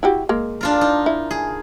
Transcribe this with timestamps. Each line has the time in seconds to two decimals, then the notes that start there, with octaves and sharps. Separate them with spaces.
0.03 E4 F#4 G4
0.29 G#3 A#3
0.61 D4 F4 A#4
0.81 D#4
1.06 E4
1.31 G#4